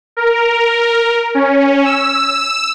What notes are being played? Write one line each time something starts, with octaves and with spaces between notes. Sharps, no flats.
A#4
C#4
E6